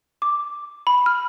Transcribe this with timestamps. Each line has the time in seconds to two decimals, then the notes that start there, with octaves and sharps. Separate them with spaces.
0.22 D6
0.87 B5
1.06 F6